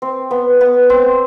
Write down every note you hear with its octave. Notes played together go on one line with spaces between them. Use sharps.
C4
B3
B3
C4